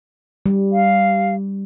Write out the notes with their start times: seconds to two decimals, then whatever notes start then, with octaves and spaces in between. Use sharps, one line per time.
0.46 G3
0.72 F5